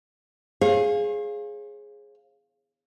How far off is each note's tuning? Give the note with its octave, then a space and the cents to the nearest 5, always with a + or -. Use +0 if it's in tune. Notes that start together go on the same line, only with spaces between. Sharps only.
G#4 +0 C#5 -45 F5 +0